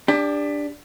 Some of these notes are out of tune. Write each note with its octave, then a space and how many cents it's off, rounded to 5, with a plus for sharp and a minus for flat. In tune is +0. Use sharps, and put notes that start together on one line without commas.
D4 +0 G4 +30